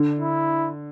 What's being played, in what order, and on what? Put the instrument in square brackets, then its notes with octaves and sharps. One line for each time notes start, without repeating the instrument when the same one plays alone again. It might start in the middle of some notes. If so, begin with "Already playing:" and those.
Already playing: [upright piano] D3
[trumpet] E4